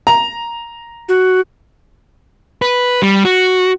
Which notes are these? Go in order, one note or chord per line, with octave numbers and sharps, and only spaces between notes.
A#5
F#4
B4
G3
F#4